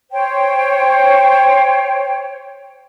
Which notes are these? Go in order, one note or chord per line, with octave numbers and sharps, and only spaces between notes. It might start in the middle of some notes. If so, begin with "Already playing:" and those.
C5 C#5 G5